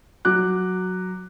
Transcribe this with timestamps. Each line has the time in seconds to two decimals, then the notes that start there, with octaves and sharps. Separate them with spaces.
0.25 F#3 D6 F#6